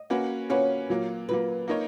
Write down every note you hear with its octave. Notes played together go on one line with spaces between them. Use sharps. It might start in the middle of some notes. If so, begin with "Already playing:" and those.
Already playing: D#5
A#3 C#4 F#4 B4
A#3 C#4 F#4 B4 C#5
A#2 F#3 A#3
A#2 F#3 A#3 B4
A#3 D#4 A#4 C#5